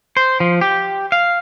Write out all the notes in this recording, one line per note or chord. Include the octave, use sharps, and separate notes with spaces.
C5
F3
G4
F5